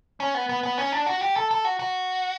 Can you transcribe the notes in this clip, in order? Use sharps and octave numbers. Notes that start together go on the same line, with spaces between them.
C#4
B3
B3
B3
C#4
D4
F#4
G4
A4
A4
F#4
F#4